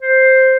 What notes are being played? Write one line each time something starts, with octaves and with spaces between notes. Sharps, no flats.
C5